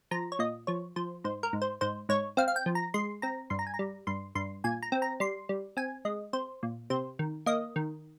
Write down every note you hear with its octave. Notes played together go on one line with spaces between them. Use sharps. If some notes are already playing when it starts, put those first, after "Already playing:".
F3 A#5
C#5
A#2 D#5
F3 C#5
F3 C5
G#2 C5
A#4
G#2
C5
G#2 C5
G#2 C#5
C4 F5
F5
G5
F3
A#5
G#3 C6
C4 A#5
G2 C6
A#5
G#5
A#5
G3
G2 C6
G2 C6
A#2 G#5
A#5
C4
A#5
G3 C6
G3
C4 G#5
G#3 D#5
C4 C5
A#2
C3 C5
D#3
A#3 D#5
D#3